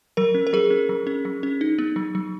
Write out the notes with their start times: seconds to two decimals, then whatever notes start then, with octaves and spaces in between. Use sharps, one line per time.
0.17 F#3 A#4
0.35 C#4
0.47 A#4
0.53 F#3 G#4
0.70 C#4
0.89 F#3
1.07 C#4
1.25 F#3
1.43 C#4
1.61 D#4
1.79 B3
1.96 F#3
2.15 F#3